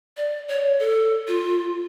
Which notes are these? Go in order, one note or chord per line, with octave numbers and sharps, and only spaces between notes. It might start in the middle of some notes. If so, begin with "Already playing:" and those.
D5
C#5
A4
F4